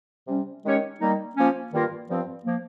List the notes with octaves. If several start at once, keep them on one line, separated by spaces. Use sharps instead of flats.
C3 G3 C#4
D#3 G#3 C#4 G4 C#5
D#3 G3 A#3 D#4
F3 A#3 C#4
G2 D#3 A#3 F4 A#4
G2 F3 C4 F4
F3 A#3